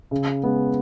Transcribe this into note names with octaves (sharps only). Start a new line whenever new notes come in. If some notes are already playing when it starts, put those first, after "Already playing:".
C#3
G#3 B3